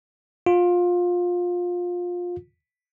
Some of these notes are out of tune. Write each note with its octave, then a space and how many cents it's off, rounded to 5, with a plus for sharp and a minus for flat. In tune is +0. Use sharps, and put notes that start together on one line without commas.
F4 +20